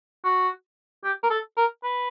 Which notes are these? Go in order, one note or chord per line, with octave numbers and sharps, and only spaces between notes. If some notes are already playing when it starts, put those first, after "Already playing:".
F#4
G4
A#4
A4
A#4
B4